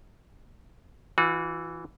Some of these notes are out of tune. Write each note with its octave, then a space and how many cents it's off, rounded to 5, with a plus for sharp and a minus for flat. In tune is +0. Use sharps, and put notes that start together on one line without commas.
E3 +0 F#4 -40